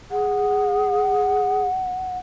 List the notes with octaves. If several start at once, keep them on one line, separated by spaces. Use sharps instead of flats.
G#4 F#5